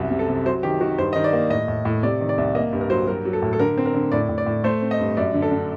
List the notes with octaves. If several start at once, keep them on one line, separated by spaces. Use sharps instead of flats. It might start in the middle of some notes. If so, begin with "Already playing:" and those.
Already playing: C2 F#2
C3
A4
C3
F#3 C5
D#3 G4
D#3 F#4
G2 C5
D#3 D#5
D5
A#3
A2 D#5
A2
A2
C3 D5
D#3
D5
C2
A#3 D#5
G2
A#4
F#3 C5
F#3 A#4
F#3
A4
A2
A4
D3 A#4
C4
A#4
D3
A2 D5
A2
D5
A2
A3 C5
C4
D#5
G2
F#2 D5
D3
A4
D3